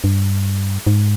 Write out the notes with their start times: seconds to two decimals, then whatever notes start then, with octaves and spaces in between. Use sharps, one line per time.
0.04 G2
0.87 G#2